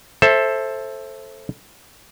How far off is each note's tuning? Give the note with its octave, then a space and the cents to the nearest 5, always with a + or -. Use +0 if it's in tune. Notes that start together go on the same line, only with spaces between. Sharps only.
A4 +0 C5 +20 E5 +0